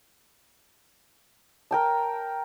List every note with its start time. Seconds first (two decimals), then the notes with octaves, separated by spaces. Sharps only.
1.71 A#4 G5 A5